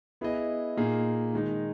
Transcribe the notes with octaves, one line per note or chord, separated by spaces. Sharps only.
B3 E4 G#4 D#5
A#2 A#3 D#4 G#4
D#3 G#3 D#4